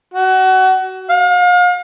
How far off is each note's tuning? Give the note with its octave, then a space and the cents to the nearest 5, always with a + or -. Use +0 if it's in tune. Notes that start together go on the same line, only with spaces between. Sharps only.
F#4 +25
F5 +40